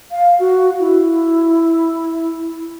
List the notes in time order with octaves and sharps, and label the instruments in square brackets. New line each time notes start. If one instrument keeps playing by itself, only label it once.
[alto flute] F5
F#4
E4